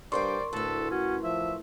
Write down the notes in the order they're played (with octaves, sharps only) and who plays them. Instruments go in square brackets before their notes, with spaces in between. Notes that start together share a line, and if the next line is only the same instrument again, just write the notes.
[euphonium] G2 [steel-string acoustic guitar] G3 C5 G5 [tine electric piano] A#4 C6 C#6 [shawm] D5
[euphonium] D2 [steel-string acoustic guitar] A2 B4 [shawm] A4
[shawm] C#4 [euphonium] F#4
[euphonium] F3 [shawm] E5